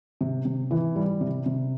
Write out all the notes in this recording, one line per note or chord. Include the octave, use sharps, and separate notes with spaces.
C3
C3
E3
G3
C3
C3